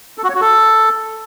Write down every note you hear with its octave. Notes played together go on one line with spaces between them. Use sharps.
A4
F#4
C#5
F#4
A4